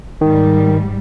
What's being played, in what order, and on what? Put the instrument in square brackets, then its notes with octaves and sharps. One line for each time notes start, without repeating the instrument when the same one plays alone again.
[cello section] G#2 G3 [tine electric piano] D#3